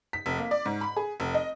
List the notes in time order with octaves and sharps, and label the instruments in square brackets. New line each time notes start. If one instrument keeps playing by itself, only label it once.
[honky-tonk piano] B6
F1
A#3
D5
G#2
B5
G#4
F1
D#5